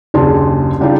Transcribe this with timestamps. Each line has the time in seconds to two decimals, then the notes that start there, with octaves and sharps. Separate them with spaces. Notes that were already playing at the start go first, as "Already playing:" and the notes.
0.14 F#1 D#2 D4 G#4 A5 C6
0.80 C#3 G3 D4 D#4 F4 G4